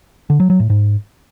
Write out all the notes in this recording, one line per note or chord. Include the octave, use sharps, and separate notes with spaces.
D3
F#3
F#3
A2
G#2